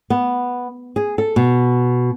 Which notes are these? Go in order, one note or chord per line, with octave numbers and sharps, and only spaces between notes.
B3
G#4
A4
B2